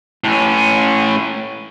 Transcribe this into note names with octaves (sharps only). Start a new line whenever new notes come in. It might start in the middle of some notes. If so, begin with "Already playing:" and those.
A2 C#4